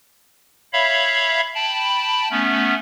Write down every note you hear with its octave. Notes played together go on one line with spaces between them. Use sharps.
C#5 E5 F5 B5
G5 A5 B5
A3 B3 C#4